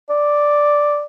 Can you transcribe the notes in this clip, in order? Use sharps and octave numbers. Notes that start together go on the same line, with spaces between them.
D5